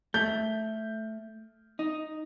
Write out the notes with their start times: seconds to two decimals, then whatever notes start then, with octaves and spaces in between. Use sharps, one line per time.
0.14 A3 G6
1.79 D#4